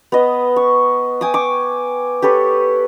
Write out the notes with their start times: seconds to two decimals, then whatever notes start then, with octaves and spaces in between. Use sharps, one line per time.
0.12 B3 B4 D#5
0.56 C#6
1.21 G5 G#5 D6 D#6
1.34 C#6 D6
2.22 G4 A4 B4 C#5